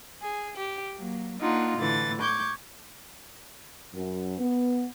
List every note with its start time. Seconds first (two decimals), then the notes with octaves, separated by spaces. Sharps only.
0.21 G#4
0.56 G4
0.95 F#3 A#3
1.39 A#3 D4 D#4 F4 F#5
1.76 A2 D3 E3 A6
2.19 C#6 D6 G6 G#6
3.93 F#2
4.38 B3